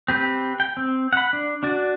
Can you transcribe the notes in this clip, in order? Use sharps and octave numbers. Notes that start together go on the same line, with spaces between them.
C4 G4 B4
G5
C4
F#5 B5
D4
D4 F#4 D5